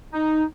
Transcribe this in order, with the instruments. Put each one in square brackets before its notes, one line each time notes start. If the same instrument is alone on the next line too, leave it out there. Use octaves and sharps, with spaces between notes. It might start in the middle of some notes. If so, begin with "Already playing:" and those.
[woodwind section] D#4